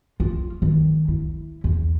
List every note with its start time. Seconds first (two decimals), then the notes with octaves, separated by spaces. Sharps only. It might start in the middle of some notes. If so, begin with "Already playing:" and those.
0.20 F4
0.62 D#3
1.08 E4
1.64 E2